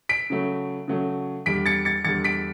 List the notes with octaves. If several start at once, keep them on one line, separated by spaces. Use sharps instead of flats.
B6 D7
C#3 F#3 A3
C#3 F#3 A3
E2 D3 G3 B6 D7
A6 C#7
A6 C#7
E2 D3 G3 A6 C#7
B6 D7